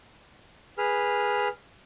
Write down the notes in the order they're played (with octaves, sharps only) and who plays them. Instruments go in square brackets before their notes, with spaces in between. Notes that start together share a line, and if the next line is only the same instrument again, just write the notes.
[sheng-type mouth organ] G#4 B4 F6